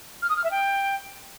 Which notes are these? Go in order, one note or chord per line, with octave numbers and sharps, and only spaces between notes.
F6
D#6
F6
E5
G5